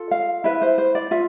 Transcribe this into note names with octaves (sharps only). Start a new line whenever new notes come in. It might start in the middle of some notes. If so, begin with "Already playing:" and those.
Already playing: F4 A4
F5
E4 B4 E5
C5
C5
D5
F4 E5